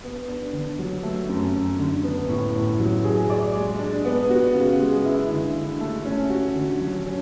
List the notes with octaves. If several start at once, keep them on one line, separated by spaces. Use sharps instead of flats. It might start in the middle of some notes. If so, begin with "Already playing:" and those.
B3
D4
D3
F#3
A3
F#2
F#2
D3
B3
A2
A2
F#3
G#4
D5
G#3
D4
B3
F#4
C#3
G#3
E4
D3
D3
A3
C#4
F#4
D3
F#3
C#4